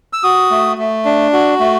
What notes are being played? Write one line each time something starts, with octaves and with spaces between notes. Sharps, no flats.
E6
F#4 D#6
A3
A3
D4
F#4
A3